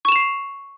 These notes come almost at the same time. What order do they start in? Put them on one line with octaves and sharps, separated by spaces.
C#6 E7 F7 C7